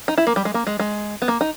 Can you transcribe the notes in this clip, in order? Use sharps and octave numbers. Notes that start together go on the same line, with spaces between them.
D#4
E4
A#3
G3
G#3
A#3
G#3
G#3
B3
A#3
D#4